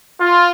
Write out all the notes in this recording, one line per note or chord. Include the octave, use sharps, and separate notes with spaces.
F4